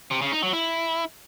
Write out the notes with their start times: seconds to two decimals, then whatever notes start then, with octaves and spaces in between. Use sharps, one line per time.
0.11 C3
0.22 C#3
0.32 D#4
0.43 F#3
0.53 E4